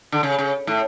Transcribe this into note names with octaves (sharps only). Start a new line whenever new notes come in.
D3
C#3
C#3
A2